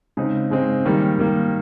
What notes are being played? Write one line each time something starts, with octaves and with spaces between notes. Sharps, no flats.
C#3 G#3 C4 D#4
C#3 G#3 C4 D#4
D#3 G3 A#3
D#3 G3 A#3